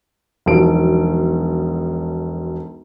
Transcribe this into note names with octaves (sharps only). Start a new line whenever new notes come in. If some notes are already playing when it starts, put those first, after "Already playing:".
E1 B1 F3 D7